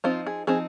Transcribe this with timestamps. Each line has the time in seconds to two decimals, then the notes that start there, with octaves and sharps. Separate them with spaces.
0.04 F3 C4 D#4 F4
0.27 G#4
0.47 F3 C4 D#4 G#4